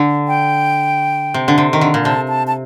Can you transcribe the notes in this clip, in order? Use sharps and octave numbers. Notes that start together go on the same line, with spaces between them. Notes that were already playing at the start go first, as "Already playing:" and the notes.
Already playing: D3
G5
C3
D3
C3
D#3
D3
A#2
C3 A5
A5
A5